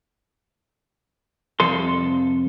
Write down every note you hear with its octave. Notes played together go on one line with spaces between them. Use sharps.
C2 F2 A4 C6